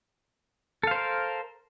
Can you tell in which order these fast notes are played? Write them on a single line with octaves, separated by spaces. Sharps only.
A4 F5 C5 A#4